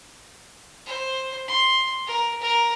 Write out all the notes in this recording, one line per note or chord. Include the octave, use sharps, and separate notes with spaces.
C5
C6
A#4
A#4